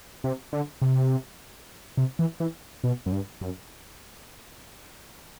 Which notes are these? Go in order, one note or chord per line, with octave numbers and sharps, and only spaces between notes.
C3
D3
C3
C3
E3
E3
B2
F#2
G2
F#2